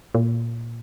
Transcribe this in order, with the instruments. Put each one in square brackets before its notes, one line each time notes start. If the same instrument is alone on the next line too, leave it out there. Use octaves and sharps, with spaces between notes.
[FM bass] A#2